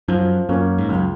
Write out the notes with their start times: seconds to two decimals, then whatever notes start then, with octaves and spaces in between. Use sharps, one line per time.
0.08 F#2 F3
0.49 F#2 A#3 C#4
0.78 G#2
0.89 C#2 F#2